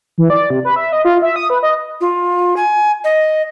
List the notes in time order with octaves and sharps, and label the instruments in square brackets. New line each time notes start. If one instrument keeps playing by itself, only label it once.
[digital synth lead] E3
D5
C3
B4
E5
D#5
F4
E5
D#6
B4
D#5
[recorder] F4
G#5
D#5